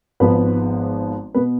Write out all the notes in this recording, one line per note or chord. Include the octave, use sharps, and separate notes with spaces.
G#1 G#2 F3 B3 B4
B2 B3 B4